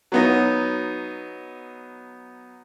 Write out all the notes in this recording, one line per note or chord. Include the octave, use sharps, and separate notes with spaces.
F#3 B3 D#4